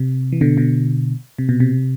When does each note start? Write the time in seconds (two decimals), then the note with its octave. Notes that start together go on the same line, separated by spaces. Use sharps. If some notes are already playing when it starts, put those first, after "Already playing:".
Already playing: C3
0.32 E3
0.41 B2 D3
0.57 B2 D3
1.38 C3
1.49 B2
1.60 C3